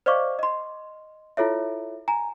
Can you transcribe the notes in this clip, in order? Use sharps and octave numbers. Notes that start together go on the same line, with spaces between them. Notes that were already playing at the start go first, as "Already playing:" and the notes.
C5 D5 D#5 F5 C#6 D6
D#5 C6
E4 F4 A4 C#5 E5
G#5 A#5